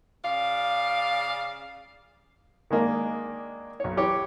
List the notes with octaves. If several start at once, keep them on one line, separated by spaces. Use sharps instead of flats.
C#3 D5 F5
D#3 G#3 A#3 D4
B1 C#5
E3 G4 C#5